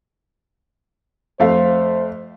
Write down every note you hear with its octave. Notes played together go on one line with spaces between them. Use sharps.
F2 A3 C5 F5